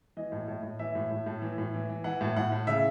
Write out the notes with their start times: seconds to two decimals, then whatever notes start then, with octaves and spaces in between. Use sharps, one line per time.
0.17 E3 D#5
0.32 A2
0.48 A2
0.63 A2
0.79 E3 E5
0.95 A2
1.10 A2
1.26 A2
1.42 E3
1.58 A2
1.74 E3
1.89 E3
2.04 E3 F#5
2.21 A2
2.36 A2 F#5
2.52 A2
2.67 C#3 E5